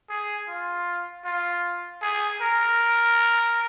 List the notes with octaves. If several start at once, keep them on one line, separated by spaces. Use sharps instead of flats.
G#4
F4
F4
G#4
A#4